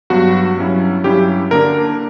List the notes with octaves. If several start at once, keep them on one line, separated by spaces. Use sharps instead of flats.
G2 F#3 B3 F#4
G2 F#3 C#4 E4
G2 F#3 C#4 E4 G4
D3 A#3 D4 A#4